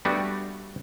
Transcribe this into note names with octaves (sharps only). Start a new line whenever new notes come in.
G3 A3 B3 D4 F#4 G4